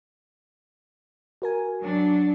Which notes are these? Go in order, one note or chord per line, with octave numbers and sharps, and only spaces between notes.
F#4 A#4 G#5
F#3 D4